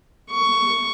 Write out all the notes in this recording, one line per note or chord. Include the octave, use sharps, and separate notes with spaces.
C#6